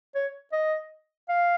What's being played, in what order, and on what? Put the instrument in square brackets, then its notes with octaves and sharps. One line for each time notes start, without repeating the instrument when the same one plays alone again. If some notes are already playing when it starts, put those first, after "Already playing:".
[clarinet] C#5
D#5
F5